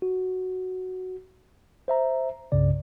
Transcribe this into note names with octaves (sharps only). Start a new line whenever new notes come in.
F#4
C5 E5 A#5
C2 G2 C#3 D5